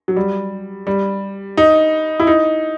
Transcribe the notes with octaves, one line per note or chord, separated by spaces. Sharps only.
F#3
G3
G3
D#4
E4
D#4